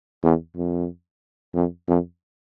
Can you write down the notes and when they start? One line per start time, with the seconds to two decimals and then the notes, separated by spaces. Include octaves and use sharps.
0.23 E2
0.56 F2
1.54 F2
1.88 F2